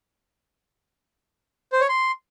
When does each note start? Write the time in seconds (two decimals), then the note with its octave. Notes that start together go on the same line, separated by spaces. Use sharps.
1.72 C5
1.81 C#5
1.89 C6